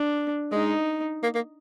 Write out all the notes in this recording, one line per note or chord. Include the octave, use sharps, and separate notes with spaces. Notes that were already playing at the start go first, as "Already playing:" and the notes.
Already playing: D4
G#3 D#4
A#3
A#3